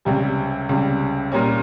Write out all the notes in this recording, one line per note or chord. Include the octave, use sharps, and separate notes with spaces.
C#2 C3 G3
C#2 C3 G3
A#2 G3 A#3 C#4